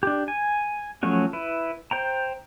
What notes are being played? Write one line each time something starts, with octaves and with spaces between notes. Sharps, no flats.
D4 G4
G#5
F3 F#3 A3 C#4 F#4
E4 B4
C5 G5 A#5